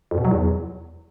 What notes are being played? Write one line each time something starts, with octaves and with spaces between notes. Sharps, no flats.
F2
B2
F#3
E2